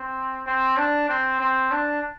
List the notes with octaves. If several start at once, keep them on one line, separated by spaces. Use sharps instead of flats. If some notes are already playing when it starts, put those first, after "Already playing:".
Already playing: C4
C4
D4
C4
C4
D4